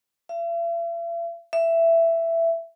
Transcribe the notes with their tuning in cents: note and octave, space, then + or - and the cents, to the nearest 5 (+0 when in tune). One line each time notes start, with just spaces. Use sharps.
E5 +45
E5 +10